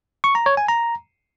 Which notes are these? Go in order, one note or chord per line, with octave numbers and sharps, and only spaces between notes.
C#6
A#5
C#5
G#5
A#5